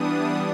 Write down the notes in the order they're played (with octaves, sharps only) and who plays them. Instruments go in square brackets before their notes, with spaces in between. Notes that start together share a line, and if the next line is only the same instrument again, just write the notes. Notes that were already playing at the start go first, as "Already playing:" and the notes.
Already playing: [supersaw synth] E3 G3 B3 D4 D#6